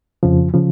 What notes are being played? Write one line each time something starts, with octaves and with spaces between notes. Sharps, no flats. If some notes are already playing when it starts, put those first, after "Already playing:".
F2 C#3 F3
C#3 F3